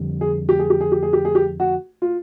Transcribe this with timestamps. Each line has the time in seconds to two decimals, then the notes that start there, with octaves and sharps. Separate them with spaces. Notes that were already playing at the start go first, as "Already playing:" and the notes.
Already playing: F2 D3 G3
0.21 G#4
0.49 G4
0.59 G#4
0.70 G4
0.81 G#4
0.92 G4
1.03 G#4
1.13 G4
1.25 G#4
1.35 G4
1.60 F#4
2.02 F4